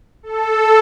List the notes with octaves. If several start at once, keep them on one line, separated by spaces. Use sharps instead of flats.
A4